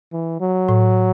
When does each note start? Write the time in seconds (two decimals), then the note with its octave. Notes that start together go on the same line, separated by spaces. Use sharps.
0.13 E3
0.41 F#3
0.69 A2